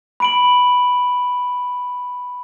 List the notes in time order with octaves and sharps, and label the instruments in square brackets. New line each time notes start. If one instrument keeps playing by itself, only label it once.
[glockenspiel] B5 D7 F#7